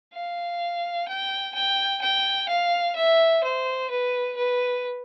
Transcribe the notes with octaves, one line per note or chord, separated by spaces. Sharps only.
F5
G5
G5
G5
F5
E5
C5
B4
B4